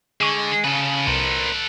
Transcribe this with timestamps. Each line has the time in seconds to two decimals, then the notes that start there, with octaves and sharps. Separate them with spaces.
0.21 D3 G#3 G#4 C#6 D7 D#7
0.64 C#3 A4 B4
1.07 C2 A#4 C5